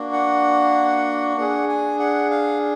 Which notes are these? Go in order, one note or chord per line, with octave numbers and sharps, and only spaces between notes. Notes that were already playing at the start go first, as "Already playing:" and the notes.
Already playing: A#3 D4 F#4
F#5
D4 G#4 F#5
G#5
F#5
F5